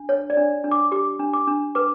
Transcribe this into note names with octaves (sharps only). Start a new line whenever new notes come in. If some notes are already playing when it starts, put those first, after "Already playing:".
Already playing: D4
C#5
D5
D4
D4
D6
G4 D6
D4
D6
D4
B4 D6